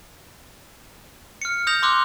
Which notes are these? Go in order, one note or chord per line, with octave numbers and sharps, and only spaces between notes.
F6 C#7
D#6 G6 A#6 F7
C6 D6 E6 F#6